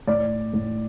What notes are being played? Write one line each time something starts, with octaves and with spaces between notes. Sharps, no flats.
A2 D5
A2